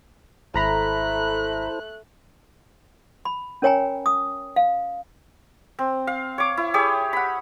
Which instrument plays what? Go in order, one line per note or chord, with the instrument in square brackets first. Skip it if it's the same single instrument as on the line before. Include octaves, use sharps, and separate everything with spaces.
[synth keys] G#1 A#5 B5 [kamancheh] A3 F#6 [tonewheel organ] E4 A4 C5
[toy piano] B5
C#4 A#4 C#5 G5 G#5 A#5
D#6
F5
[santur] C4
F5
C#5 D6
E4
G4 G#4 C#5
F#5 B5